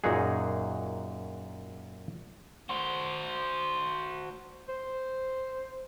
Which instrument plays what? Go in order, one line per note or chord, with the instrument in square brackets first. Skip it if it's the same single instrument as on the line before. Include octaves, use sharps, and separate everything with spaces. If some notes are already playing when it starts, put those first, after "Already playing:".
[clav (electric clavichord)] F#2 A#2 D#4 F#4 G#4
[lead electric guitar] F#4 C5
[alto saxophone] C5